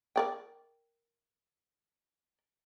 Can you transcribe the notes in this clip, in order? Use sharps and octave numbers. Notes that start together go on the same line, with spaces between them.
A#4 D5 G5